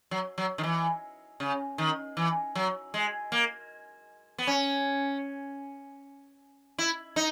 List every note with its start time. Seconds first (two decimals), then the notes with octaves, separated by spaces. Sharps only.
0.11 F#3
0.38 F#3
0.58 D#3
0.63 E3
1.40 C#3
1.78 D#3
2.17 E3
2.55 F#3
2.94 G#3
3.32 A#3
4.38 B3
4.47 C#4
6.78 E4
7.16 D#4